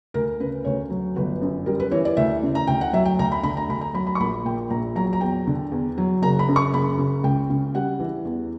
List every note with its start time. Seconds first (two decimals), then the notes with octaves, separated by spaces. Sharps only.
0.14 D2 A#4
0.40 C#3 B4
0.65 D2 C#5
0.90 F#3
1.16 G1 B4
1.41 F#2
1.66 G3 A#4
1.80 B4
1.91 E3 C#5
2.05 D5
2.17 D2 E5
2.43 C#3
2.55 A#5
2.67 D2 G5
2.81 F#5
2.93 F#3 E5
3.05 G5
3.19 D2 A#5
3.32 B5
3.43 D3 B5
3.57 A#5
3.69 D2 B5
3.81 A#5
3.94 F#3 B5
4.07 B5
4.15 C#6
4.20 A#1 B5
4.45 A#2 G5
4.70 A#1 A#5
4.96 F#3 A#5
5.13 A#5
5.21 E2 G5
5.47 D3
5.72 E2
5.98 F#3
6.22 F#1 A#5
6.39 B5
6.48 F#2
6.56 C#6
6.74 F#1 B5
6.98 C#3
7.23 C#2 G5
7.50 C#3
7.75 G3 F#5
7.99 E3
8.25 E2